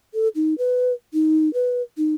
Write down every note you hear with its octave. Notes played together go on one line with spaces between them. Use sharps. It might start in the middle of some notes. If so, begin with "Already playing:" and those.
A4
D#4
B4
D#4
B4
D#4